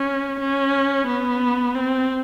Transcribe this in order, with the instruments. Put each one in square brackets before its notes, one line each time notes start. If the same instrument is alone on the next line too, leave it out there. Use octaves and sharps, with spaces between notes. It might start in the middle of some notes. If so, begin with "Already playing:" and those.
Already playing: [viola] C#4
C#4
B3
C4